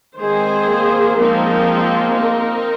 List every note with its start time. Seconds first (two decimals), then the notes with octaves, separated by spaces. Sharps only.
0.19 D#3 G#3 C4 G#4 C5
0.68 A#3
1.17 F3 G#3 A#3 C4 D#4
2.15 C4 D#4 A#4